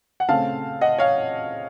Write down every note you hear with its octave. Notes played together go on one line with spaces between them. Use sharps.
F#5
C#3 A3 C4 F5 A5
D#5 F#5
C#5 F5